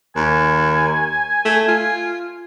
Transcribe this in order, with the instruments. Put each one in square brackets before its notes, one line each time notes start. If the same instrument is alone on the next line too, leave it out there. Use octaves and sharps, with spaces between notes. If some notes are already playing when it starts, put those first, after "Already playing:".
[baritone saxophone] D#2 [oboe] G#5
[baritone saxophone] A3
F4